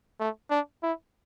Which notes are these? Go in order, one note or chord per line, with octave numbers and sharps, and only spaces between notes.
A3
D4
E4